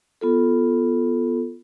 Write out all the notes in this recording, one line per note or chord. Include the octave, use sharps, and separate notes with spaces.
B3 F4 A4